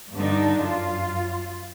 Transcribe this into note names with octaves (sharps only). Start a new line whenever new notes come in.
G2 D3 D4 D#4
F#2 F4